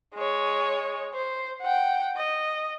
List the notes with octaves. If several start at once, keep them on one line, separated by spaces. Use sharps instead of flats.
G#3 C#5
C5
F#5 G5
D#5